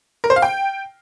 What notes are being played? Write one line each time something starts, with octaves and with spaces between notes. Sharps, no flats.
A#4
C5
F5
G5